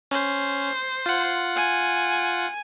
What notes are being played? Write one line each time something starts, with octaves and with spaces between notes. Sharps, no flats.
C#4 C5
F4 F#5
G#5